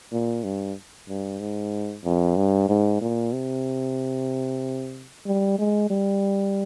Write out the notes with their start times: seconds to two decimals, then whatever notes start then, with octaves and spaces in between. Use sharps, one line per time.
0.12 A#2
0.44 G2
1.08 G2
1.40 G#2
2.04 F2
2.36 G2
2.69 G#2
3.01 A#2
3.33 C3
5.26 G3
5.58 G#3
5.90 G3